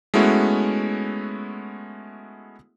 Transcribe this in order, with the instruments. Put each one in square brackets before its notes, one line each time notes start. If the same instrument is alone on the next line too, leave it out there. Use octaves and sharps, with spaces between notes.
[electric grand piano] G#3 A3 B3 C#4 E4 F#4